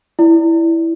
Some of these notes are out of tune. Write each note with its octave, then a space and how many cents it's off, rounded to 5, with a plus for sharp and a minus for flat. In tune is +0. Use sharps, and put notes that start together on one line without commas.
E4 +0 D5 +0